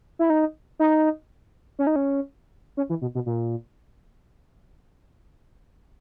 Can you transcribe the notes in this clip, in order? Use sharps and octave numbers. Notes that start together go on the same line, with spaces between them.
E4
D#4
D#4
C#4
D#4
C#4
C#4
E3
B2
B2
A#2